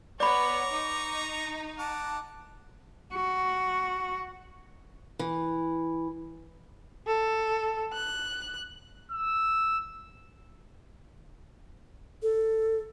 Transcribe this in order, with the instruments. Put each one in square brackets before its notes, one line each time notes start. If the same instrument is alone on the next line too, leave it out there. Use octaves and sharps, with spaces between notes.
[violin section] B3 C#5 [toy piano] D5 B5 [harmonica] A#5 C#6 [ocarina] D6
[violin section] D#4
[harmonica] F#5 D6 [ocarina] A5
[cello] F#4
[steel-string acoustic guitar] E3
[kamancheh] A4
F#6
[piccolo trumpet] E6
[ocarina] A4